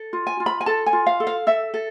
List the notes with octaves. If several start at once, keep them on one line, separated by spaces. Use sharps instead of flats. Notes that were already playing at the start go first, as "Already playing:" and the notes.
Already playing: A4
F4
G#5
F4
B5
G#5
A4 A5
G#5
F4
F5
A4
F5
A4 E5
A4